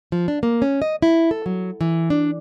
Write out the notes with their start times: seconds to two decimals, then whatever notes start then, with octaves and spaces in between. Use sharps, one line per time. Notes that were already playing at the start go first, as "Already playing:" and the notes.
0.12 F3
0.28 D4
0.43 A#3
0.62 C#4
0.82 D#5
1.02 E4
1.31 A4
1.46 F#3
1.81 E3
2.10 D4